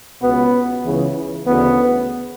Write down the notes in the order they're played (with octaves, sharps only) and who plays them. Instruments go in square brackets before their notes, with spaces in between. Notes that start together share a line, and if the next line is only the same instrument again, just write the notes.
[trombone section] C#2 B2 B3
C#2 C#3 E3
D2 C#3 E3 B3